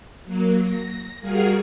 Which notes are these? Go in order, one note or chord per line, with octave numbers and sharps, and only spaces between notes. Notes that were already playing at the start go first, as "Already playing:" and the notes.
F#3 A#3
A#6
G3 F#4 G#4 A#4 F5